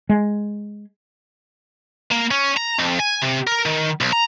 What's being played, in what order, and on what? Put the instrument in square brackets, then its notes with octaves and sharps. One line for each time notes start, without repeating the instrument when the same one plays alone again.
[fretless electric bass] G#3
[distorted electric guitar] A#3
C#4
A#5
F2
G#5
C3
A#4
D#3
B1
A#5